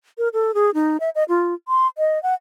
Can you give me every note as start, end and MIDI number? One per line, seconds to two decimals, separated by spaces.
0.18 0.28 70
0.33 0.54 69
0.54 0.70 68
0.74 0.97 63
1.00 1.10 76
1.15 1.24 75
1.29 1.54 65
1.68 1.87 84
1.98 2.21 75
2.23 2.34 78